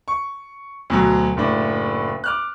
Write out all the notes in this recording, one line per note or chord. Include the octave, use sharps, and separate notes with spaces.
C#6
D2 B2 F#3
F#1 A2 D4
D6 F6 F#6